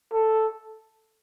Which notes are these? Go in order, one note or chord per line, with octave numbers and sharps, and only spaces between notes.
A4